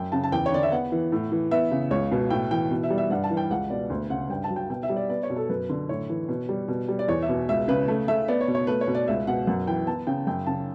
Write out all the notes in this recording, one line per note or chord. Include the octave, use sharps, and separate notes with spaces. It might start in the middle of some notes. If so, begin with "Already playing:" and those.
Already playing: F#2 G5
C#3 A5
A5
E2 G5
C#5
D3 D5
E5
B3 F#5
E3
A2
E3
B3 E5
C#3
C#2 C#5
B2
A2 G5
E3 G5
B2
E5
G3
E5
G2 F#5
A5
E3
G5
C#2 F#5
B2 D5
D2
C#3 F#5
G2 G5
A5
F#3
G5
B2 G5
E5
G3
D5
B3 D5
C#5
B2
A4
F#2 B4
D3
A2 C#5
E3
B2
G3
B2
G3
D5
E2 C#5
E5
B2
C#2 E5
C#3 B4
A3
A3 E5
B3 D5
C#5
B2
C#5
A3 B4
C#5
B2
D5
C#2 E5
B2 F#5
F#2 F#5
E3 G5
B3 A5
C#3 G5
F#2 G5
C#3 A5